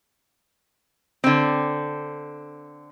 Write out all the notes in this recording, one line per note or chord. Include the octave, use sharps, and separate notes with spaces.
D3 C4